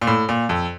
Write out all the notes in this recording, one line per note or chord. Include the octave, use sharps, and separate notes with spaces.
A#2
A2
A#2
F2